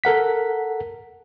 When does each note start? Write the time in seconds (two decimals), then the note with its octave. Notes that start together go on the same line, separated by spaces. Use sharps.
0.04 A4 A#4 F#5 B6